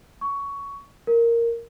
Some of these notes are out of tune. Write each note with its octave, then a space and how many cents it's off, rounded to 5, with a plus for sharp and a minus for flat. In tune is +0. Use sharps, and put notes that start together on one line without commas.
C#6 +15
A#4 -5